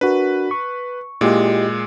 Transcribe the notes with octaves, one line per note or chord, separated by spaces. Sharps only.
D4 F#4 A#4 B4
C#6
A#2 G#3 E4 G4 D#5